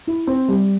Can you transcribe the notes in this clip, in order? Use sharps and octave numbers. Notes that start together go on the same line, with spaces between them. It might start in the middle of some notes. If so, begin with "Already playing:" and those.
E4
C4
G3